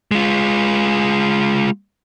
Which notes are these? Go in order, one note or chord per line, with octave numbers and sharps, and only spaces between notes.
G#3 F4